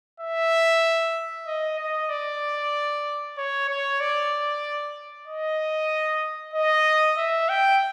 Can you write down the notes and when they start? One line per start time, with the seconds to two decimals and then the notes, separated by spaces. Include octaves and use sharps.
0.20 E5
1.46 D#5
1.79 D#5
2.09 D5
3.37 C#5
3.69 C#5
4.00 D5
5.28 D#5
6.54 D#5
7.17 E5
7.49 G5